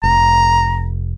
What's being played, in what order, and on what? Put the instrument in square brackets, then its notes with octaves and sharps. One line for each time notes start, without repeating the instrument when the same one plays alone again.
[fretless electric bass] F1 [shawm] A#5